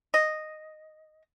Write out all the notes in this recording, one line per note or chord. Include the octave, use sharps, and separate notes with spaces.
D#5